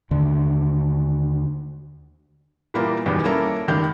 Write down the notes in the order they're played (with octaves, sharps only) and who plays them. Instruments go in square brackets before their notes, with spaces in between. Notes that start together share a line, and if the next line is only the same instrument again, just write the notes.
[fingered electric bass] D#2 D3 D4
[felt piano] A#2 E3 G3 A#3 B3 A#4
B1 E2 G2 D#3 G3
A#3 C#4 E4 A4 A#4
F1 C#2 D#3 G4 G6